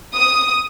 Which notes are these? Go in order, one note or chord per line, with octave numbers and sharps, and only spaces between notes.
D#6